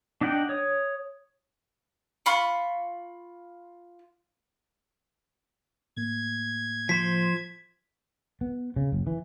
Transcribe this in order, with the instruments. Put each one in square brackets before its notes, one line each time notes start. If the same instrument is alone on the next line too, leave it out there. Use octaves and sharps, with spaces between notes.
[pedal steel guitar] D4 D#5 F#5 G5
C#5 D#6
[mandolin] F4 B5 C#6
[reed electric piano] A2 A#3 [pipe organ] G#6
[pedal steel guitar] F3 C5 C6 [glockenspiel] B6
[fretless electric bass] B3
C#3
F#1
E3